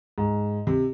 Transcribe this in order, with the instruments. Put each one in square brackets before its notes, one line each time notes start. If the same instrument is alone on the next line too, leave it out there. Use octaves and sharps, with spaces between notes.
[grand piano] G#2
C3